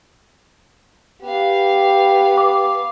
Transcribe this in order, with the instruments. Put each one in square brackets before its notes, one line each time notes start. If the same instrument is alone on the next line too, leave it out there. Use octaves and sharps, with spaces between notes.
[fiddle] B3 F5 [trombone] G4
[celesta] D6